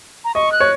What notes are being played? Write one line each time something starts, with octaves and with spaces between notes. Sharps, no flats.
A#5
D#5 C#6
F#6
C#5